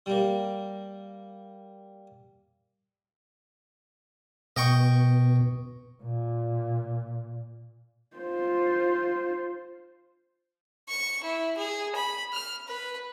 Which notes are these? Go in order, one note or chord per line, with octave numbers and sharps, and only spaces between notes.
G3 A#3
B2 D#5 G5 C#6
A#2
F4 C5
C#6
E4
G#4
B5
F6
B4